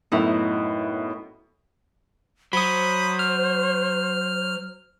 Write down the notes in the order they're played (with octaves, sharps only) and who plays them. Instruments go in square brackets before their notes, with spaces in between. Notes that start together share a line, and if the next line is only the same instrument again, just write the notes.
[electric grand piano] F#2 A2 B3 [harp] D#4 E4
[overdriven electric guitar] F#3 [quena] C5 [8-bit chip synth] B5 D#6
[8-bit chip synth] F6